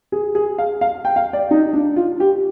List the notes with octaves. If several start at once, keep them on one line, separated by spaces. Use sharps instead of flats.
G#4
G#4
F5
F5
G5
F5
D5
D#4
D4
F4
G4